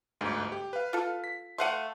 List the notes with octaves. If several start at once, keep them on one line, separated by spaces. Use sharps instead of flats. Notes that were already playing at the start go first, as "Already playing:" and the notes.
G1 D2 G#2
G4
B4 F5
F4 A4
B6
A3 F5 F#5 C6 F#6 D#7